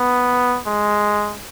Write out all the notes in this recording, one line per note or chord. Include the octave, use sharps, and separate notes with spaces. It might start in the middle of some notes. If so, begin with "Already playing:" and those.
Already playing: B3
G#3